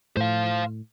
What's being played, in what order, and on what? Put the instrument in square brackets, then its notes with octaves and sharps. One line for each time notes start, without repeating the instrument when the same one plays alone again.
[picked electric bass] A2 [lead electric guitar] C5 F5